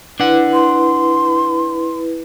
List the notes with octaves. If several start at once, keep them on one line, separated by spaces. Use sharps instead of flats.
D4 E4 B4 F#5
C6